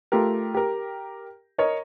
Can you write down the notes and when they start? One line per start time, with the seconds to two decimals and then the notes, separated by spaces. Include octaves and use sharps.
0.12 A3 F4 G4 A#4
0.54 G4 A#4
1.58 A#4 C#5 D#5